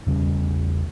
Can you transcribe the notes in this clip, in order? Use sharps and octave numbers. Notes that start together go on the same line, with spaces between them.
E2 C#3 G3 C#4